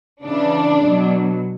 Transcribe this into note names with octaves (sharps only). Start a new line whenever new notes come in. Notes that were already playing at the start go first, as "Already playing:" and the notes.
C#3 E3 D4
B2 F#3